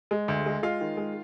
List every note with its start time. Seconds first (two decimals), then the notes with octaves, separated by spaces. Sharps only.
0.11 G#3
0.28 D2
0.46 G#3
0.63 G#3 F4 F5
0.81 D#3
0.97 G#3